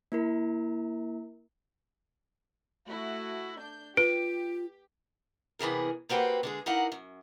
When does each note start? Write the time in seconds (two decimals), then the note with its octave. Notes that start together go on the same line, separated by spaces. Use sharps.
0.12 A#3 E4 A#4
2.88 A3 E4 F#4
3.59 D4 G6
3.97 F4 G4 B4 D7
5.59 C3 E3 B3 G#4 A#4
6.09 A#3 C4 F#4 G4 B4
6.43 D3 G#3 G#4
6.66 D#4 E4 A#4 D5 F5 F#5
6.92 F#2